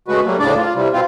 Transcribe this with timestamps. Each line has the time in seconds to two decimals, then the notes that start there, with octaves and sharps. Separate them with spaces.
0.08 C#3 G#3 A3 F#4 B4
0.25 F#3 G3 A3 A#3
0.39 D2 A2 C#3 D4 D5
0.57 F4
0.74 C3 E3 G3
0.93 B2 C4 F4